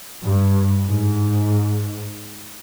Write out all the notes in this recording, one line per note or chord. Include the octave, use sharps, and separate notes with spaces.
G2
G#2